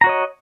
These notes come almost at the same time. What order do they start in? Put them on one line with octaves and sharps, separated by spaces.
A#5 F#4 C#5 D#5